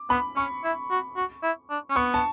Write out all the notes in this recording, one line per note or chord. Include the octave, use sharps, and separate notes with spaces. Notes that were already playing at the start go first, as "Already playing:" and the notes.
Already playing: D6
B3 B5
C#4 C#6
E4
F#4
F#4
E4
D4
C#4
B3 C#6
A5